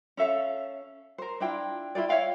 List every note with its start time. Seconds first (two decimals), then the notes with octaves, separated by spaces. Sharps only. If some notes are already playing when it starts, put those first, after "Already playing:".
0.17 C#4 A4 E5 F5
1.18 A#4 C5
1.40 D4 E4 F4 G5
1.95 E4 F4 G#4 D5
2.09 C#5 E5 F5 G5